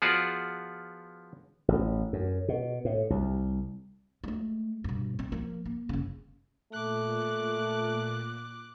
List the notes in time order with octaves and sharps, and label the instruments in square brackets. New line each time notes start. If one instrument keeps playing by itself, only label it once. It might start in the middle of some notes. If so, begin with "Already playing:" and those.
[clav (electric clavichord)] F3 B3 F4 F#4 G#4 D5
[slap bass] A1
F#2
B2
A2
C2
[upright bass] G#3 A3
G2 B2
C4
F3 A#3
A#3
F#1 C#3
[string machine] A#2 [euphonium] A3 [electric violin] D6 F#6